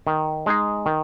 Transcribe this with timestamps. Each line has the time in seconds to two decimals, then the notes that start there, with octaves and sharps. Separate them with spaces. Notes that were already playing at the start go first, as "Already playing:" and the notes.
0.07 D#3
0.46 G#3 D#4 G#4
0.86 D#3